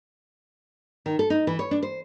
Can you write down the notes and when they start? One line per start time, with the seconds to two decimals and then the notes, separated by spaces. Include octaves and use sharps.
1.06 D#3
1.19 A4
1.30 D#4
1.47 E3
1.59 C#5
1.71 D4
1.83 C5